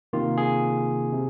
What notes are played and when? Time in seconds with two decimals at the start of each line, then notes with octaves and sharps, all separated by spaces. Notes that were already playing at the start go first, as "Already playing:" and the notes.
0.13 C3 D#3 A#3 F4
0.38 G#4
1.13 C3